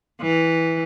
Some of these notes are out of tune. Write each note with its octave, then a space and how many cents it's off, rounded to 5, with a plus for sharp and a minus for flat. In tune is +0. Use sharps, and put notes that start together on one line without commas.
E3 -10